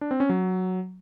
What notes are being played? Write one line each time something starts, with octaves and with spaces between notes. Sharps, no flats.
D4
C4
C#4
F#3